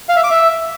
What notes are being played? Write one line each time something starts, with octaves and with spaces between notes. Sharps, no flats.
F5
E5
D6
E5